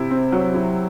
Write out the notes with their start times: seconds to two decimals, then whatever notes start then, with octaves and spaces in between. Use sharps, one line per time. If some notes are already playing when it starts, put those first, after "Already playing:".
Already playing: C3 E4
0.11 C4
0.32 F#3
0.54 E4